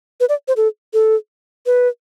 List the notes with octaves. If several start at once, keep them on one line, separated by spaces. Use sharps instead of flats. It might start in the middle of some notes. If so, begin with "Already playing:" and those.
B4
D5
C5
A4
A4
B4